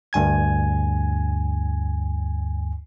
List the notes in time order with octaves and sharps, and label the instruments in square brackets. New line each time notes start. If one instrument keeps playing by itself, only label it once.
[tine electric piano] D2 G2 G#5 G#6